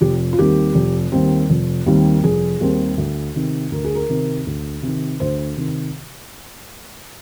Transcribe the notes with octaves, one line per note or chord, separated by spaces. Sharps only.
F1 G4
F4
D#2 D#3 G3 C4 G4
F1
D#2 D#3 G3 C4
F1
D#2 D#3 G3 C4
F1 G#4
D#2 D#3 G3 C4
D2
C3 D#3
D2 A#4
G#4
A#4
C3 D#3
D2
C3 D#3
D2 C5
C3 D#3